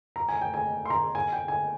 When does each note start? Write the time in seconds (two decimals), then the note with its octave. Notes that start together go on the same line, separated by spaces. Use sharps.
0.16 A#5
0.29 G#5
0.41 G5
0.54 G#5
0.85 C6
0.90 A#5
1.15 G#5
1.32 G5
1.48 G#5